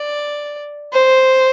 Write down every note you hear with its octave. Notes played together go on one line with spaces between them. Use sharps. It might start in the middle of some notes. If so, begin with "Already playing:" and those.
Already playing: D5
C5